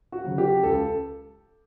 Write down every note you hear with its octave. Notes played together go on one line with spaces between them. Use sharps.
F#4
C#3 F#3
G4
C#2 A4